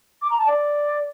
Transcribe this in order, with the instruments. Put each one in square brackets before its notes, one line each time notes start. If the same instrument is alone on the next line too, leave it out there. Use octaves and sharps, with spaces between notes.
[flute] D6
A#5
A5
D5